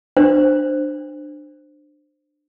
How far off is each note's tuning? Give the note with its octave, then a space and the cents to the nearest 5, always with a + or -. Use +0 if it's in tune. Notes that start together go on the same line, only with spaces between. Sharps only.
D4 +10 C5 +0